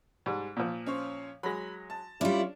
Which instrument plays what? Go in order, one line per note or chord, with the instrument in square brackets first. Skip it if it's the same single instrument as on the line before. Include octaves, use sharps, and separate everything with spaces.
[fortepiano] G#2 G3
A#2 F3
[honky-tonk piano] C#4 C5 C#5
[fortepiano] F#3 G#3 [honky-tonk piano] B5 A#6
[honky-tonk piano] A5
[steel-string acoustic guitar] G3 E4 [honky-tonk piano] C#4 [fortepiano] D4 [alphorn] F4